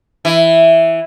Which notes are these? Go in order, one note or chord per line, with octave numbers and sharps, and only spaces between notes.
E3